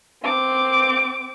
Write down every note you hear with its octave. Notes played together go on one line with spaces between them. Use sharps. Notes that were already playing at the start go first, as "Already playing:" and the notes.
C4 D6